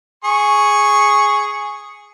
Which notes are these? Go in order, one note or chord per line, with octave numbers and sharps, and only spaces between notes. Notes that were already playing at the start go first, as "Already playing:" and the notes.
G#4 C#6